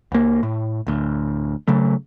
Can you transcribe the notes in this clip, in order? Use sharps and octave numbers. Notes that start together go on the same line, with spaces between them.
C#2 A#3
A2
D1 D2
C#3 F#3 A3